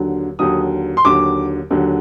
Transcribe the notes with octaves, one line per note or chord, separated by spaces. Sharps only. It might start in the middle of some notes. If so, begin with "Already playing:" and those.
Already playing: D#2 D3 F#3
D#2 D3 F#3 D#6
C6
D#2 D3 F#3 D6
D#2 D3 F#3